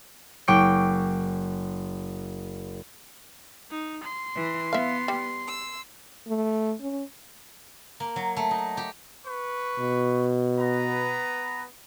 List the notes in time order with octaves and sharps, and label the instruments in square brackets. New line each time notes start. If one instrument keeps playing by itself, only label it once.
[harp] F#1 G5 C#6 D6 C#7
[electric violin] D#4
C6
[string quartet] E3
[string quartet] B3 [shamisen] E5 F5
[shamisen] G3
[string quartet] E6
[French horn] A3
C#4
[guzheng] A#3
F#3
A3
D#4
G4
[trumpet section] B4 C#6
[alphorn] B2
[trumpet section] B3 B4 A#5